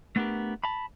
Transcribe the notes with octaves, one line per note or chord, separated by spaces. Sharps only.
A3 B3 D4 G4 A#4
A5 B5